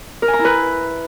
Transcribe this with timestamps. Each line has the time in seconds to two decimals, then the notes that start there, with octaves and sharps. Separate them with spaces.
0.22 A#4
0.28 G#5
0.33 A#5
0.39 E4
0.45 B4